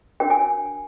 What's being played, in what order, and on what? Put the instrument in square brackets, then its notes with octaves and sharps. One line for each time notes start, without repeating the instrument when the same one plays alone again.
[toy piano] D4 F#4 A#4 C#5 G5
G#5